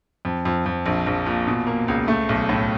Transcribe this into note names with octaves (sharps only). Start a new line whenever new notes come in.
F2
F2
F2
A#1
A#1
A#2
B2
A#3
C#2
A3
B1
A2